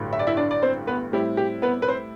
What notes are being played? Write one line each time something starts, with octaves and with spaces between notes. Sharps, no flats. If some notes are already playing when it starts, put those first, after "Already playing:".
Already playing: A1 G2 D3 F#3
E5
D5
E4 E5
D4 D5
D5
C4 C5
B3 B4
A2 G3 C4 E4 G4
G4
B3 B4
B4
C4 C5